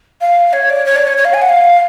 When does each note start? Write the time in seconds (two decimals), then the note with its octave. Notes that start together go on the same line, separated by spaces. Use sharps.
0.21 F5
0.53 C#5
0.69 D5
0.85 C#5
0.96 D5
1.07 C#5
1.17 C#5
1.24 F5
1.33 G#5
1.41 F#5
1.49 F5